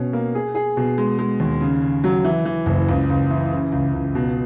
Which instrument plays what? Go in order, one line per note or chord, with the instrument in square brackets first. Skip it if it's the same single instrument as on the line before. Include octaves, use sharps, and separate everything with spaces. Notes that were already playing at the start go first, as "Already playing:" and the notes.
Already playing: [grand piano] B2 C#4
A#3
G#4
G#4
B2
G#3
G#3
D#2
C#3
C#3
F#3
E3
E3
F#1
C#2
C#2
E3
C#3
C#2
C#2
B2